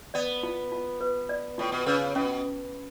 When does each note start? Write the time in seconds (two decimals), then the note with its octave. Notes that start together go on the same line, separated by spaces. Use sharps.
0.14 B3 D5
0.43 F4
0.72 F4
1.01 B4
1.29 D5
1.58 A2 F4
1.72 B2
1.86 C#3 B4
2.15 B2 C#4